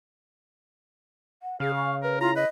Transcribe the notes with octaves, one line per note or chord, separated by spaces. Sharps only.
F#5
C#3 G#4 F5
C#6
A#4 B4
E4 F4 A#5
B4 D#5